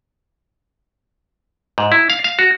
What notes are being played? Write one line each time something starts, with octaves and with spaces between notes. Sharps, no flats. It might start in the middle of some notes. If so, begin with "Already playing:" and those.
G#2
E4
F5
F5
F#4